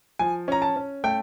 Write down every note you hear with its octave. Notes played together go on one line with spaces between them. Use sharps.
F3 G#5
C#4 A#5
A5
C#4
A3 G5